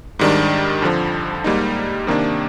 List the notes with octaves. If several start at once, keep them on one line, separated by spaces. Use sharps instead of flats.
G#2 D#3 G3 D4
F2 D3 F3
G#2 G3 A#3 D#4
C3 D#3 A#3 D4